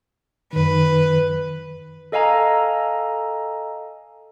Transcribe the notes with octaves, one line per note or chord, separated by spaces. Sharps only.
F#2 D#3 B4
A4 D#5 F5 G#5 A#5